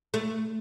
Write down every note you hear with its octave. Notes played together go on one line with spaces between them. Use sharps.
A3